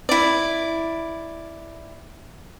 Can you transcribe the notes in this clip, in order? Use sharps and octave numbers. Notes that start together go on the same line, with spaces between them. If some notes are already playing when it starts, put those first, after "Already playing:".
E4 D5